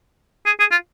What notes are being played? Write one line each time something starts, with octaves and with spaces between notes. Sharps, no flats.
G#4
G#4
F4